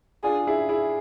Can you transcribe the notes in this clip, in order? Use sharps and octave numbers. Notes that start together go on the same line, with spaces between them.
D4 F4 G#4
E4 G#4
E4 G#4